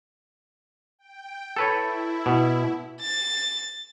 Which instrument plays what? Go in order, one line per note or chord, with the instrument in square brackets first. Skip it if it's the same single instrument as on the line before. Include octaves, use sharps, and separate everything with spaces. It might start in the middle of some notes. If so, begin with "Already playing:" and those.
[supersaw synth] G5
[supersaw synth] E4 [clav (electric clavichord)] A4 B4 C#5
[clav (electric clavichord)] B2
[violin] A6